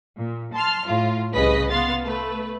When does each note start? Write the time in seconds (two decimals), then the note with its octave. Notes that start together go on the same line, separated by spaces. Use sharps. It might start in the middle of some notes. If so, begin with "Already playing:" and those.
0.17 A#2
0.53 A5 C6 F6
0.87 A2 F4
1.32 C2 C#3 G#4 B4 D#5 B6
1.69 B3 F5 C6 A6
2.03 A3 B4